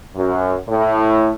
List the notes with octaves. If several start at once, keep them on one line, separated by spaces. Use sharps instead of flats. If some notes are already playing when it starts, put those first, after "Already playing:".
F#2
A2